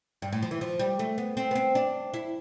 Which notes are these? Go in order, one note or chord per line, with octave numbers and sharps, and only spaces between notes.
G2
A2
F3
E3
F3
G3
A3
B3
C4
B3
C4
D4
E4